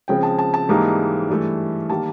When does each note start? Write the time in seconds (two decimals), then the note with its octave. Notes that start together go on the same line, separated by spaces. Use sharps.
0.08 C#3 F3 G#3 C4 G5
0.23 A5
0.39 A5
0.54 A5
0.69 G#2 E3 G3 A#3 D#4
1.29 G2 E3 A3
1.89 D#3 G3 A#3 A5